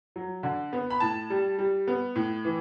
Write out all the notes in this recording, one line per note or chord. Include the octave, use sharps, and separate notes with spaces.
F#3
D3
B3
B5
A2 A5
G3
G3
B3
A2
E3